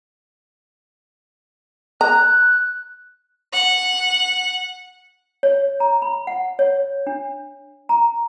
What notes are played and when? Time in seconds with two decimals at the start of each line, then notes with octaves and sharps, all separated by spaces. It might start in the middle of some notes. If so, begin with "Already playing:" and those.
2.01 A#5 F#6
3.53 F#5
5.43 C#5
5.80 A#5
6.02 B5
6.27 F#5
6.59 C#5
7.07 D4
7.89 A#5